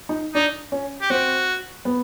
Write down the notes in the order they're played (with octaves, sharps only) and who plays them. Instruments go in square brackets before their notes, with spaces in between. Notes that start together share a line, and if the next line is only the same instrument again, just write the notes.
[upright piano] D#4
[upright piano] D4 [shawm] D#4
[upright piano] C#4
[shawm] G4
[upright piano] C4 [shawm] F#4
[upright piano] B3